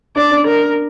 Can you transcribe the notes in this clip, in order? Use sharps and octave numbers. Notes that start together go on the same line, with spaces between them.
D4 D5
D4
A#4